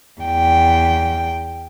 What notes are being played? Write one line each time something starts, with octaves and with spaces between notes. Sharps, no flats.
E2 G5